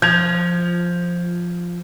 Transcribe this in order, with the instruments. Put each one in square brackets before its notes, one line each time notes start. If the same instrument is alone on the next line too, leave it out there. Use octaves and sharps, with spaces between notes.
[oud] F3 [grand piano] G6 G#6 F7